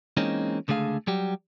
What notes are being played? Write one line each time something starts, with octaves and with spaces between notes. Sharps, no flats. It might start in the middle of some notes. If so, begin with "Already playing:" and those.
E3 G#3 A#3 C4 C#4 D#4
C#2 D3 A3 G#4 F5
F#3 G3 G4